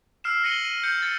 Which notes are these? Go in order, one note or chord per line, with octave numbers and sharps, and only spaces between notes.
E6 F6 C7 E7
A#6 C#7 D#7 F#7 G7
D#7
G6 C#7
A6 C#7